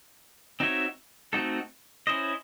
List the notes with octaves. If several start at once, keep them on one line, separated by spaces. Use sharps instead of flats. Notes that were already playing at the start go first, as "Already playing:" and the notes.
C4 D#4 F#4 C#5 E5
A3 C4 D#4 F#4 A4
C#4 E4 C5 D#5